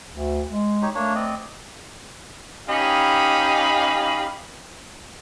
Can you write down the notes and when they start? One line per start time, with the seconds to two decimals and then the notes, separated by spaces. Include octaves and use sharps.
0.11 D2
0.52 G#3
0.82 D#4 G4 C#5
0.95 A3 A#3 D4 C#5
1.15 C4 D5 D#5
2.69 C#4 D#4 G4 D#5 F5 B5